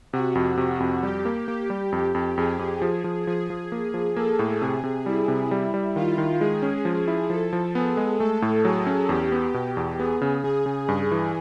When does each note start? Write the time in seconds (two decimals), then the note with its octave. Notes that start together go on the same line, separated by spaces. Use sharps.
0.13 C3 F#4
0.35 F2
0.57 C3
0.80 F2
1.03 G3 G4
1.25 A#3
1.48 A#3 G4
1.70 G3
1.92 F2
2.15 F2
2.37 F2 G#4
2.59 F2
2.82 F3
3.04 F3
3.27 F3 G#4
3.50 F3
3.72 A#3
3.94 F3
4.16 A#3 A4
4.39 A2
4.61 C3 G#4
4.84 C3
5.06 G3 E4
5.28 C3
5.51 G3
5.74 G3
5.96 D#3 F4
6.18 D#3
6.40 G#3 G#4
6.62 C#4
6.85 F3
7.08 E4
7.30 F3 A4
7.53 F3
7.75 B3 G#4
7.97 G#3
8.20 A3 A4
8.42 A2
8.64 F#3 G#4
8.86 C#4
9.09 E2 G4
9.32 B3
9.54 B2 G4
9.77 E2
9.99 B3 G#4
10.21 C#3
10.44 C#3 G#4
10.66 C#3
10.88 G2 G#4
11.11 E3